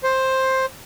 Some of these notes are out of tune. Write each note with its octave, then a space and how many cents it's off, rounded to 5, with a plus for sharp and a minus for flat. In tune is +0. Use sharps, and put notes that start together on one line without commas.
C5 +10